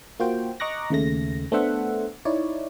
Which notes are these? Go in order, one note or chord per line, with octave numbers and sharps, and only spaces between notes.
A#3 F4 F#4 C5 G5
D#5 A#5 C#6 D6 F#6 A#6
D#2 C#3 A3 A#6
A3 B3 D4 C5 E5 F#5
D#4 E4 C#5 D5